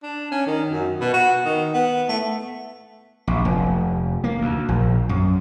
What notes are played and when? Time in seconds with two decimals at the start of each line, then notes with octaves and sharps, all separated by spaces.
0.03 D4
0.32 C#4
0.47 D#3
0.70 F#2
1.01 B2
1.14 F#4
1.45 D#3
1.73 B3
2.08 A3
3.27 A#1
3.45 F1
4.24 A#3
4.41 D2
4.69 A#1
5.09 F#2